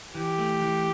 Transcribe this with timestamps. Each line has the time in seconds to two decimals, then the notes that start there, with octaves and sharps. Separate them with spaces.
0.13 E3 G4
0.38 A3
0.62 E3